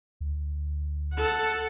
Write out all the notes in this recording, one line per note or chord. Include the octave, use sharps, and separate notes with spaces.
D2
A4 F#5